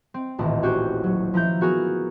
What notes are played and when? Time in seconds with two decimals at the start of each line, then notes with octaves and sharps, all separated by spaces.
0.14 C4
0.38 D#1 A1 E4
0.62 C#4 F#4 G4 C5
1.03 F#3
1.34 F3 E4 A#5 G6
1.61 B3 F#4 G#4 A#4